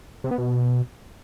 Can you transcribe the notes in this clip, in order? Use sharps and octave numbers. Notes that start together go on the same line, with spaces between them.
C3
B3
B2